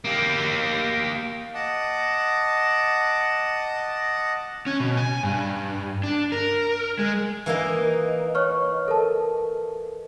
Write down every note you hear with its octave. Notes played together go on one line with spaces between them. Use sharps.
A#3 G4
D#5 F#5 A5 D6
C#4
B2
G#5
G2
D4
A#4
G#3
E3 A#3 D#4
C#5 C#6 F6
A4 A#4 A5